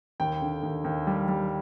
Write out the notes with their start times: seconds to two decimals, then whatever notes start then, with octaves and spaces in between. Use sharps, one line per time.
0.20 D#2 G5
0.42 D3
0.63 D#2
0.84 D#2
1.07 G3
1.28 G3